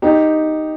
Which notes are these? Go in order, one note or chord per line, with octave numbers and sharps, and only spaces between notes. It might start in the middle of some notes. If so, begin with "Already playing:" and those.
D#4 G4